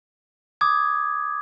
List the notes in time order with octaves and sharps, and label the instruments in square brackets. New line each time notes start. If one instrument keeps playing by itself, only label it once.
[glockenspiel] D6 D#6 G#6